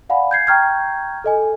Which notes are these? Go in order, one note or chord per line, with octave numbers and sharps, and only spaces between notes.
D5 F5 F#5 G#5 B5
G6 G#6 C7
G5 A#5 C#6 F6 G6 G#6
A4 D#5 G#5